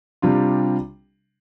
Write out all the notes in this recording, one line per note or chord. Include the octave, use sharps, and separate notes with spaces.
C3 G3 D4 F4